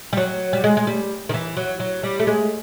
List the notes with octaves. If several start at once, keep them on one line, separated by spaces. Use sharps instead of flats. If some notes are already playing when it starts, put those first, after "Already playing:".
G3
F#3
G3
G#3
G#3
G3
D#3
E3
F#3
F#3
G3
A3
G#3